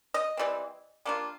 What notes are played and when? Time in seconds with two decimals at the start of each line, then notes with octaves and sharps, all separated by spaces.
0.14 D#5
0.37 E3 G3 C4
1.05 G3 A#3 D4 F4